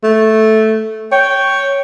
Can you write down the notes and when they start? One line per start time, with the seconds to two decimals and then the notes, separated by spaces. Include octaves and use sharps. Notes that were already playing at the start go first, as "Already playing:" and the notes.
0.03 A3
1.12 C#5 G5